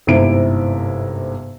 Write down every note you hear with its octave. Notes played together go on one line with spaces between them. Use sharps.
G1 G#2 C3 E4 D7